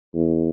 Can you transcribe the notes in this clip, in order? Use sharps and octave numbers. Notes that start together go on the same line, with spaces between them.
E2